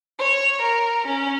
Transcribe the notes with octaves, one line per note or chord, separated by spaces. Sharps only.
C#5
A#4
C#4